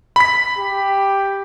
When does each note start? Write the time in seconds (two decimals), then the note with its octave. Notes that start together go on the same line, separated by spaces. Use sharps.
0.16 B5 B6
0.59 G4